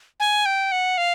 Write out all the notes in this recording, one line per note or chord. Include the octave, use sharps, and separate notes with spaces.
G#5
G5
F#5
F5